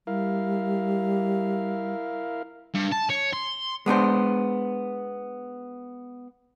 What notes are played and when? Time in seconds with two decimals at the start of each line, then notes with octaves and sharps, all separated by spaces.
0.07 G3 E4 A#4 F5
2.75 G2
2.92 A5
3.10 C#5
3.33 C6
3.86 G#3 B3 D4 C5